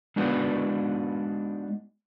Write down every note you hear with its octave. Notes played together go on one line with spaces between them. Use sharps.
G#3 B3 D4 D#4 F#4 B4